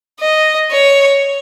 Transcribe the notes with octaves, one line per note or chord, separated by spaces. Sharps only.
D#5
C#5